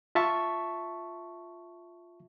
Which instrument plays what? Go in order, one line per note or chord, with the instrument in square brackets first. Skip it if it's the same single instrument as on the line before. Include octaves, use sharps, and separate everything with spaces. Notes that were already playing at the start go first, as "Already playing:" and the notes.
[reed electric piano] F4 E5 A5 C#6